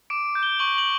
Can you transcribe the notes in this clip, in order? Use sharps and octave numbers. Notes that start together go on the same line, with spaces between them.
D6 D7
G6
G7
C#6 F#7
F#7